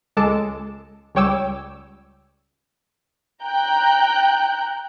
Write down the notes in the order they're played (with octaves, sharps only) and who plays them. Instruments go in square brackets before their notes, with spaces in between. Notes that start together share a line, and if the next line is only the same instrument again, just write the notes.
[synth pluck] C#2 G#3 A4 A5 D6
C#2 G3 C#5 G5 D6 E6
[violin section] G5 A#5 F#6 G6